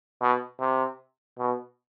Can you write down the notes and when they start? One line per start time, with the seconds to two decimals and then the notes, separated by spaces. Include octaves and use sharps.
0.21 B2
0.60 C3
1.39 B2